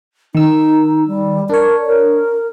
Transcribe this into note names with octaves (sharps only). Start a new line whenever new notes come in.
D#3 D#4 E6
G3
D4 A#4 C#5
A#4